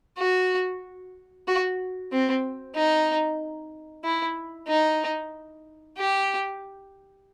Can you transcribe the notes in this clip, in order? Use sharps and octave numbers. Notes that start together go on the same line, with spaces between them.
F#4
F#4
C4
D#4
E4
D#4
G4